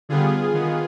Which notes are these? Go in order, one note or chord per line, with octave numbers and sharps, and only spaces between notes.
D3 G3 B3 F4 G#4
D#3 B3